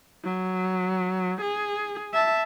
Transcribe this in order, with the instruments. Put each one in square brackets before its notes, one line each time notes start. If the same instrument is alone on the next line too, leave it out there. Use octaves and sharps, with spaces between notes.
[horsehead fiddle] F#3
G#4
E5 A5